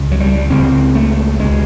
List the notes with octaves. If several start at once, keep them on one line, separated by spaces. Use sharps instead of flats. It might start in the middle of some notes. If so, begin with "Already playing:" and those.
Already playing: C#2 C#3
F#3
G3
C#2 C#3 C4
A3
C#2 B2 G#3